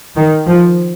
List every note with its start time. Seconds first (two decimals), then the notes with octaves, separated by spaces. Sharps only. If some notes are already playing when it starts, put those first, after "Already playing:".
0.16 D#3
0.47 F3